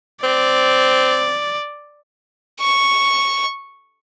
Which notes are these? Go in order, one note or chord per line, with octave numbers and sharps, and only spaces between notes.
C4 D5
C#6